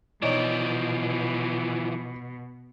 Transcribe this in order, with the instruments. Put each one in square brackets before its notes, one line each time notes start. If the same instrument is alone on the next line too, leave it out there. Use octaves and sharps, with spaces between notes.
[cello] B2 [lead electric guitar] E3 F3 [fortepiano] D#4 C#5 D5